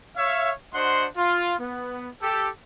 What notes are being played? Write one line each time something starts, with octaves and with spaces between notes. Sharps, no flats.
C#5 E5 F5
D4 F#4 C5 D#5 F#5 C6
F4
B3
G4 A4